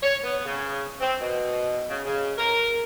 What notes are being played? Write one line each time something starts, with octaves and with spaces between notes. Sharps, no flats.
C#5
B3
C#3
C4
B2
C#3
C#3
A#4